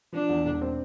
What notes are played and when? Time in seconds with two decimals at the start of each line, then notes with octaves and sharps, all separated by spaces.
0.13 F3 D4
0.29 E2
0.45 E1
0.62 C4